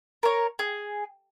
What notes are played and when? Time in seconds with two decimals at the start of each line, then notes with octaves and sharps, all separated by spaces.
0.23 A#4 C#5
0.59 G#4